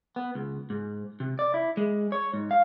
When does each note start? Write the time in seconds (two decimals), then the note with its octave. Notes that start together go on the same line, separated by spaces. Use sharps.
0.16 B3
0.35 C#2
0.70 G#2
1.20 C3
1.39 D5
1.54 E4
1.77 G#3
2.12 C#5
2.34 G#2
2.51 F5